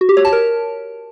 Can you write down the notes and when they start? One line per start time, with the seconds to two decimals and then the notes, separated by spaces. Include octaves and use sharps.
0.01 F#4
0.09 G4
0.17 C#5
0.25 A5
0.33 A#4